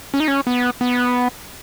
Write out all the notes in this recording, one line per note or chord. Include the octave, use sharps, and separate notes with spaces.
C#4
D#4
C#4
B3
B3